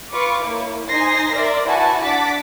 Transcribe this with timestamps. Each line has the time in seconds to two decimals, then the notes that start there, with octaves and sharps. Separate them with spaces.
0.12 F4 B4 C#6 D6
0.42 A#3 E4 C#5
0.88 D#4 C5 G#5 C6 A#6 C7
1.33 A#4 D5 E5 C6
1.66 E4 F#4 B4 G#5 A5
2.02 D4 F#5 A5 D6 A6 B6